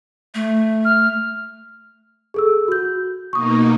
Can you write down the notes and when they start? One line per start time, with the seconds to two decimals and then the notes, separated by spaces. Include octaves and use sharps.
0.35 A3
0.85 F6
2.34 G#4 A4 E6
2.68 F#4 G6
3.33 B2 A#3 D#4 C#6 D#6